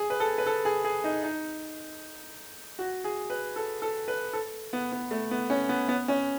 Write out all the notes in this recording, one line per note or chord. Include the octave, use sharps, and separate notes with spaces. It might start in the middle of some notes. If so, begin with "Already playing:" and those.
Already playing: G#4
B4
A4
B4
A4
G#4
G#4
D#4
D#4
F#4
G#4
B4
A4
A4
B4
A4
B3
B3
A3
B3
C#4
B3
B3
C#4